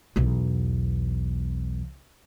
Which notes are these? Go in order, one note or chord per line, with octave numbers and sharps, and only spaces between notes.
B1 E2